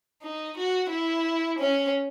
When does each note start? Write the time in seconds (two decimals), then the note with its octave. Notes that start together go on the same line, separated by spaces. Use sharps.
0.22 D#4
0.57 F#4
0.90 E4
1.59 C#4